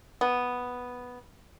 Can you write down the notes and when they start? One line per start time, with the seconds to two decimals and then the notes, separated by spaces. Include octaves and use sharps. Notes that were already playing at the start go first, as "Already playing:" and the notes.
0.21 B3